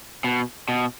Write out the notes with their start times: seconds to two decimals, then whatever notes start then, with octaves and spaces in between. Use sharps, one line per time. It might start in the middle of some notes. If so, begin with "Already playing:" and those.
0.24 B2
0.69 B2